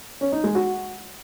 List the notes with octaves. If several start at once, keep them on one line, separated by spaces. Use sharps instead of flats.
C#4
D#4
G#3
F#4